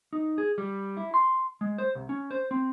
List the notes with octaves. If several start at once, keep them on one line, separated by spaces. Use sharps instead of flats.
D#4
G#4
G3
E4
C6
G#3
C5
C2
C#4
C5
C4